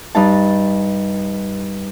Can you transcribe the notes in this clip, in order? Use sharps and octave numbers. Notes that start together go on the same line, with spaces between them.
G2 D#4 A5